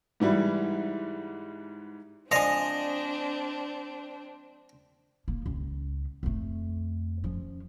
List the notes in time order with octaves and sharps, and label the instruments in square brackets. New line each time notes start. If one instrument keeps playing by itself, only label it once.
[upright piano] G#2 E3 G3 E4
[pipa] F3 G#3 [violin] C4 D4 [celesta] D5 F7 [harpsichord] D#5
[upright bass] A#3
C#2
F2 A3
F3 C#4